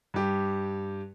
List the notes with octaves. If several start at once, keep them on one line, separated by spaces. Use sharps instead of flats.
G2 G4